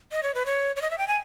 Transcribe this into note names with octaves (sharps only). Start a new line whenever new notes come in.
D#5
C#5
B4
C#5
C#5
D#5
E5
G5
G#5